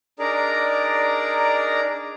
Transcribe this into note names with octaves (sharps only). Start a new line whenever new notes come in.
D4 D#4 G#4 A#4 D5 A#5